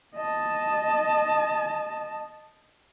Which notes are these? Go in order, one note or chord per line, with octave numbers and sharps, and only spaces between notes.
D#5 A5